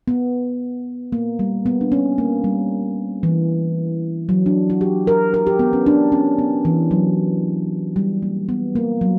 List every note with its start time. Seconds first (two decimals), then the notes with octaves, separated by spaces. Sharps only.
0.08 B3
1.12 A#3
1.39 G3
1.66 B3
1.81 D4
1.92 C#4
2.18 A#3
2.44 G3
3.23 E3
4.29 F#3
4.46 D4
4.70 F#4
4.81 G4
5.07 A#4
5.34 A#4
5.47 G4
5.59 B3
5.73 C#4
5.86 D4
6.12 C#4
6.39 B3
6.65 E3
6.91 F#3
7.96 G3
8.23 A#3
8.49 B3
8.76 A#3
9.01 F#3